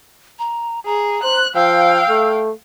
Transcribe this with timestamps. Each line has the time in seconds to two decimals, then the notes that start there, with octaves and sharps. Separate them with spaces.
0.39 A#5
0.86 G#4 A#5
1.24 C5 F#6
1.56 F3 F5 G5 E6
2.09 A3